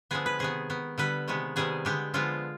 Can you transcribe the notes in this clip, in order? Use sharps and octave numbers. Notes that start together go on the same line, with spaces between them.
D3 F3 G#3 B3 G#4
B4
C3 D#3 B3 G#4
D#3 B3
D3 G3 B3 B4
C3 D#3 G#3 B3
C3 D#3 G3 B3 G#4
D3 G#3 B3 G4
D3 F3 G#3 B3 F4